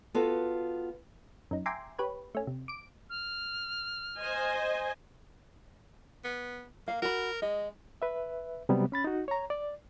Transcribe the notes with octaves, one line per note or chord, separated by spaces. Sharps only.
B3 F4 F#4 A4
F#2 D#4
E5 G5 G#5 A#5 C6 D6
G4 B4 C#5
A3 C#4
C3
D6 D7
F6
C5 D#5 G#5
B3
A#3 A#4 F5
F#4 A#4 B5
G#3 D#5
B4 E5
C3 F#3 G3 B3
C#4 B5 A6
D#4 F#4
C#5 A#5
D5